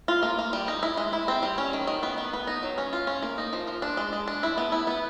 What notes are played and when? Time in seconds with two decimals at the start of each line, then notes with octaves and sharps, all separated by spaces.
0.08 F4
0.23 A#3
0.39 A#3
0.53 G3
0.68 D#4
0.83 E4
0.97 G#3
1.13 E4
1.28 C4
1.43 G3
1.58 C#4
1.73 D#3
1.87 D#3
2.03 B3
2.18 B3
2.33 B3
2.47 D#4
2.63 F#3
2.78 C#4
2.93 F4
3.07 C#4
3.22 A#3
3.38 D#4
3.53 F3
3.67 F3
3.82 D4
3.97 G#3
4.13 G#3
4.28 D4
4.43 E4
4.58 B3
4.72 E4
4.87 B3